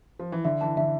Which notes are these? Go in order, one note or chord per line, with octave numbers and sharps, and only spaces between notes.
F3
E3
D3 E5
E3 A5
D3 E5